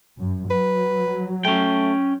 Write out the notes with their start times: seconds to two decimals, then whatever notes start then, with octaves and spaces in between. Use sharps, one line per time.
0.19 F#2
0.50 F#3 B4
1.45 A3 C#4 G5